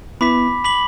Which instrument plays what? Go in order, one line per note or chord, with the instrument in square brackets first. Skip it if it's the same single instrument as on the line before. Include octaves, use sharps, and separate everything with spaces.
[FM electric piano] B3 E4 [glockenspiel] B5 D6 B6
[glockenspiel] B5 D6 B6 F#7